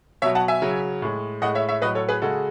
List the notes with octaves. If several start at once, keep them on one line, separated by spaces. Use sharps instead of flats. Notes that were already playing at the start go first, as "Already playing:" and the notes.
B2 F#3 C#5 E5
F#5 A5
E5 G#5
C#3 F#3
A2 G#3
A2 G#3 D#5 F#5
C#5 E5
C#5 E5
A2 F#3 B4 D#5
A4 C#5
G#4 B4
C#3 G#3 F#4 A4